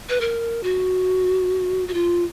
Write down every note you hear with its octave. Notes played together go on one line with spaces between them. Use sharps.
B4
A#4
F#4
F#4
F4